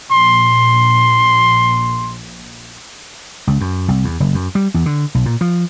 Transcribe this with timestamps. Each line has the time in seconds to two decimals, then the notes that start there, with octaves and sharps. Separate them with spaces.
0.12 A#1 C6
3.47 C#2
3.61 F#2
3.88 C2
4.05 E2
4.20 F#1
4.34 F#2
4.55 G3
4.74 E2
4.86 D3
5.15 B1
5.26 A#2
5.41 F3